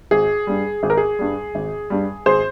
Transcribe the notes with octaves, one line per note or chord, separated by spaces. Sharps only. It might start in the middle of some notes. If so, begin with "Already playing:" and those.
G#1 G#4
G2 G3
G#1 G#4
A#4
G#4
G2 G3
G#1
G2 G3
G#1 G#4 C5